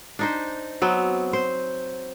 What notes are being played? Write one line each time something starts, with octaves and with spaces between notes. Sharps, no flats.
D4 D#4 C5
F#3 B3 C4
C5